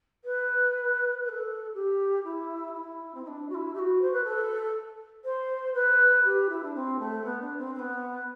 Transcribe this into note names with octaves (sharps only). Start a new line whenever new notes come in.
B4
B4
A4
G4
E4
E4
C4
E4
D4
F#4
E4
G4
F#4
C5
B4
A4
C5
B4
G4
E4
D4
C4
A3
B3
D4
C4
C4
B3